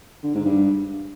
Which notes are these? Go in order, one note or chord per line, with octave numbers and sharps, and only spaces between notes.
D3
G#2
G2